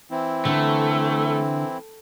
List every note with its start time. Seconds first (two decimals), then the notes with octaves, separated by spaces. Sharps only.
0.11 E3 C4 E4
0.45 D3 A3